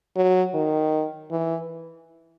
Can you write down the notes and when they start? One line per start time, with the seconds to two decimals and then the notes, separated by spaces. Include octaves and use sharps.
0.16 F#3
0.54 D#3
1.31 E3